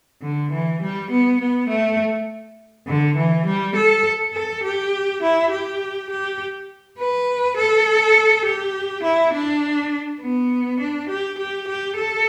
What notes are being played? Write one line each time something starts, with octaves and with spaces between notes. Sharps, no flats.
D3
E3
G3
B3
B3
A3
D3
E3
G3
A4
A4
G4
E4
G4
G4
B4
A4
G4
E4
D4
B3
D4
G4
G4
G4
A4